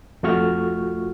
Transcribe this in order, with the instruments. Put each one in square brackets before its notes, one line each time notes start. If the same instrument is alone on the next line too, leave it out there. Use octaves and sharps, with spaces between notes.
[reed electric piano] F2 A3 F4 F#4 C#6 F6